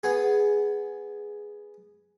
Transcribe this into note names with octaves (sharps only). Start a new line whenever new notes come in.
B3 G#4